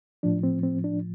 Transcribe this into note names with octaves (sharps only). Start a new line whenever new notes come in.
A2 F3 D4
C4
C4
D4